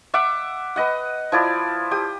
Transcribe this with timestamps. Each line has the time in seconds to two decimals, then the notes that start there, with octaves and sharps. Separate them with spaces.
0.14 E5 F#5 D6
0.76 B4 D#5 F#5
1.32 F3 E4 D5
1.91 G4 D#6